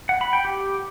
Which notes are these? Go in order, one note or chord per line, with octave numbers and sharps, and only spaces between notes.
F#5
B5
G5
G4